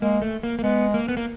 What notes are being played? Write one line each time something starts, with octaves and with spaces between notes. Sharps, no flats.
G#3 A#3
A3
A#3
A#3
G#3 B3
A#3
B3
A#3